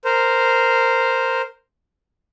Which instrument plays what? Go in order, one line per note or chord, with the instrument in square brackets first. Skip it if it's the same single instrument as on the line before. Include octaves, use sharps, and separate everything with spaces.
[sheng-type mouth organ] A#4 C5